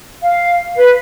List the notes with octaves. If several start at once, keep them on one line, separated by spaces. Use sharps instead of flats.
F5
B4